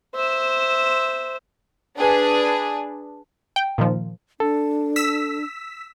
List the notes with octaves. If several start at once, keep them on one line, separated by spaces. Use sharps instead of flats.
C5 E5
D4 G#4 B4
G5
A#2 D#3 F3
D4 A4
E6 B6